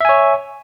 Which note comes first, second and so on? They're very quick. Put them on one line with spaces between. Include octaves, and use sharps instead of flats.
E5 G#5 C#5